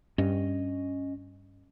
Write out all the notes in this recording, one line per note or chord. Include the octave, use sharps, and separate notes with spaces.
G2 C#4 D#5